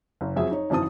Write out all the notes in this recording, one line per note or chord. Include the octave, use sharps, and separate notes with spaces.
F#1
F2 F#3 G#4 E5
D#4 C#5
G#1 F#2 E3 C5 A5 D#6